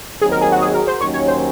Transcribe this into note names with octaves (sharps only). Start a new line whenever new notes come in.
D#2 D#3 F#3 C4 D#4 G#4
A#4
G#4
F#4
G#4
A#4
C5
D#2 D#3 F#3 C#4 C#5
C#5
C5